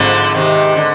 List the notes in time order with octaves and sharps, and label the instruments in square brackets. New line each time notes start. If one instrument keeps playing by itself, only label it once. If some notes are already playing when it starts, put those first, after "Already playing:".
Already playing: [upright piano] G#1 G#2 C4 [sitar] D3 F3
[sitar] C3 D#3
D3